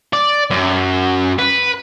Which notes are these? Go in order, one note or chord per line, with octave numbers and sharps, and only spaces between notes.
D5
F#2
B4